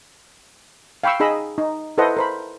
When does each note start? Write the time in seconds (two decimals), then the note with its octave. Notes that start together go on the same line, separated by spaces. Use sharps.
1.03 F5 G5 B5 C#6 E6
1.20 D#4 G#4 D#5 B5 E6
1.58 D#4
1.98 E4 A4 B4 C5 D#5 F#5
2.17 A#4 C5 B5